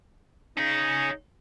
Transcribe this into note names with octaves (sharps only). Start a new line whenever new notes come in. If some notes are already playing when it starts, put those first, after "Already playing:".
C#4 D#4 G#4